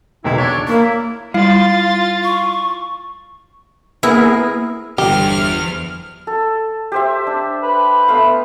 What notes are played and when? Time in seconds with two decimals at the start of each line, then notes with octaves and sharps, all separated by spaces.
0.24 B1 E2 D#3 E4
0.38 D4 C#5
0.68 A#3 E4
1.34 G3 E4 F4 F5 A6
2.24 C#6
4.03 A#3 B3 E4 G#4 A#4
4.98 G1 E2 G4 F6
6.27 A4
6.92 G4 C5 E5
7.27 D4
7.63 B4
8.08 A3 B3 F5